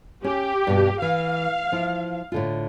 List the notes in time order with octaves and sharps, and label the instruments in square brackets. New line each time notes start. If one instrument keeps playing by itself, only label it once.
[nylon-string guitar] C#4 [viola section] G4
[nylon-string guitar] G2 B2
[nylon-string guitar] E3 [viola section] F5
[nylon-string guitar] F3 E4
A2 D3 F4